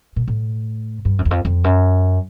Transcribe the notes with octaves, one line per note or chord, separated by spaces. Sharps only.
A#2
A2
G2
F#2
E2
F2
F2
F#2